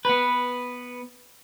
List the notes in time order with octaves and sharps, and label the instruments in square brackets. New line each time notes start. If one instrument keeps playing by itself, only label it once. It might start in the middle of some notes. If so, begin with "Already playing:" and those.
[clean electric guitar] B3 B4